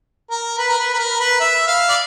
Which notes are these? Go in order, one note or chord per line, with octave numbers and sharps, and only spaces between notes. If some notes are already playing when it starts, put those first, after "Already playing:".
A#4
B4
A#4
B4
B4
A#4
B4
E5
F5
D5